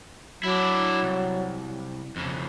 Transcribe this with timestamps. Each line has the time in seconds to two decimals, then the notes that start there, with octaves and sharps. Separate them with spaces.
0.43 F#3 D4 E4
1.03 C2
2.16 F2 C#3